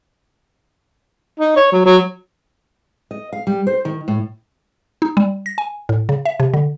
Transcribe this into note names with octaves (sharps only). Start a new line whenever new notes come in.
D#4
C#5
F#3
F#3
D#5
F5
G3
C5
D#3
A2
D#4
G3
A#6
G#5
A2
C#3
E5
C3
D3